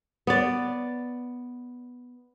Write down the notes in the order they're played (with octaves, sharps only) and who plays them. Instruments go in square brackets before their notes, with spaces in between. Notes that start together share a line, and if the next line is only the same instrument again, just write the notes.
[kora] B3 D5